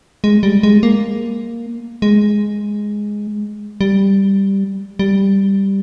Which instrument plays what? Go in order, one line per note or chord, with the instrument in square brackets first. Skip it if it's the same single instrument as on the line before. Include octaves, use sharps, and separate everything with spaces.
[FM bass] G#3
G3
G#3
A#3
G#3
G3
G3